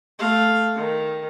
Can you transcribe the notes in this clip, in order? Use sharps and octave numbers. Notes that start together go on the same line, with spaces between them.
A3 F5
D#3